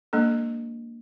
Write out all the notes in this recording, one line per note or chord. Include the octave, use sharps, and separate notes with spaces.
G#3 A#3 D4 A4